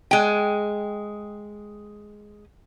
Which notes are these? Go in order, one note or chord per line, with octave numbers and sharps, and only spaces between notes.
G#3 G5